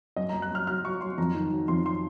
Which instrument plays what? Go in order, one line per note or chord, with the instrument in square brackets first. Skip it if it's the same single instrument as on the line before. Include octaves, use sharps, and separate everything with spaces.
[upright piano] F#2 D#5
A#5
F#2
F#6
F#2 F6
F#3 F6
F#3 C#6
F#3 C6
F2 A#5
D#3
F#3
F2 C6
C6